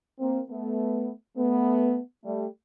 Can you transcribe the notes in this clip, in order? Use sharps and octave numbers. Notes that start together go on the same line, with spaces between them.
A#3 C4
A3 B3
A3 B3
G3 A3